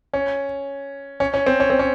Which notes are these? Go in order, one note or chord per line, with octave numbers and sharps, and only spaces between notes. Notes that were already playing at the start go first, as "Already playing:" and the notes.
C#4
C#4
C#4
C4
C#4
C4
C#4